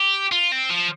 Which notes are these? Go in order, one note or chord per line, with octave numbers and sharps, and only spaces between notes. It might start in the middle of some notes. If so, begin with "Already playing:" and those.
Already playing: G4
F4
C4
F3